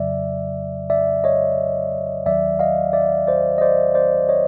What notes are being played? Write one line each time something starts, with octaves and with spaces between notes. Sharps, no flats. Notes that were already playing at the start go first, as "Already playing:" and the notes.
Already playing: F2 C#3 F#3 D5 E5
D5 E5
C#5 D#5
D#2 D#3 F#3 D5 E5
D#5 F5
D5 E5
C5 D5
D#5
C5 D5
C5 D5
C#5 D#5